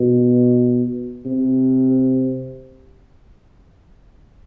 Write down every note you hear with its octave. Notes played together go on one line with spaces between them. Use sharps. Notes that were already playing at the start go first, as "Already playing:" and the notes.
Already playing: B2
C3